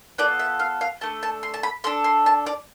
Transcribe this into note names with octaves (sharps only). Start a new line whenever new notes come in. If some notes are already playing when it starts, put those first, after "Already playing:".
B3 F4 A4 D5
E5
F5
F5
A3 D4 A4 A5
A5
C6
A5
B5
D4 A4 C6
C6
A5
D5